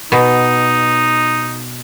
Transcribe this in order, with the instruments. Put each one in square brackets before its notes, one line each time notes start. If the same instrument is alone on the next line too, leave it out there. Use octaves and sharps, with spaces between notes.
[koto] B2 [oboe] D#4